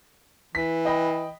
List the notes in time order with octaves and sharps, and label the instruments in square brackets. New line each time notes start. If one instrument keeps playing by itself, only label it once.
[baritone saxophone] E3 [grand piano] B6
[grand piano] D#5 G5 B5